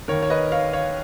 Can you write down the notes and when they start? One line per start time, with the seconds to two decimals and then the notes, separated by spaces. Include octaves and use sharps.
0.08 D#2 D#3 A#4 C#5
0.23 C#5
0.30 B4 D#5
0.52 C#5 F5
0.73 C#5 F5